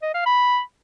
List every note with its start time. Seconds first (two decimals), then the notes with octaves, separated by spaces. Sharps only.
0.02 D#5
0.14 F5
0.26 B5